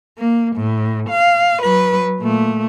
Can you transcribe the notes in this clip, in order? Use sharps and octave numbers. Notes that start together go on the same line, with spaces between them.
A#3
A2
F5
F#3 B4
A#2 A3